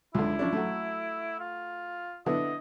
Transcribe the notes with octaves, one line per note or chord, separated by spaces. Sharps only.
C#2 D3 E4
F3 C#4 D4
F#3 A3
F4
D3 B3 E4 D#5